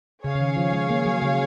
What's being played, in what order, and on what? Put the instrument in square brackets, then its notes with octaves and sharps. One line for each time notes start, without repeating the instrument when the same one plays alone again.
[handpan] C#3 [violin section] G#4 C#5 F5
[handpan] C#3
D#3
F3
G#3
A#3
F#3
C#3